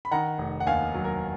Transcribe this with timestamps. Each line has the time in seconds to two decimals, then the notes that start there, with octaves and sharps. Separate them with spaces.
0.05 B5
0.11 D#3 F#5 A#5
0.38 F1
0.60 F#5
0.66 D#2 F5 G#5
0.94 F#3
1.04 A#4